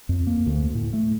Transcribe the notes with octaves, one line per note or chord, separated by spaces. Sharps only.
F2
A#3
D2
A2
A3